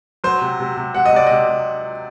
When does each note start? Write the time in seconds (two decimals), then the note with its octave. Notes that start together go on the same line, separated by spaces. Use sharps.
0.24 F#3 C5
0.41 C3
0.60 C3
0.77 C3
0.95 C3 F#5
1.06 D#5
1.13 C3 D5
1.27 C3 D#5
1.48 C3